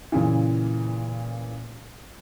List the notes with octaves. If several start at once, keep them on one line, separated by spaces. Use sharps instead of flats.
A#2 C#3 E3